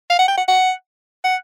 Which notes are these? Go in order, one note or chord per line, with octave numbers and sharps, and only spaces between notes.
F5
F#5
G5
F#5
F#5
F#5